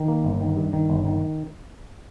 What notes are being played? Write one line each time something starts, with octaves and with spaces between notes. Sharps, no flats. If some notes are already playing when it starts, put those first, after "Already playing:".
Already playing: D#3
A#3
G1
D#3
G2
D#3
G1
D#3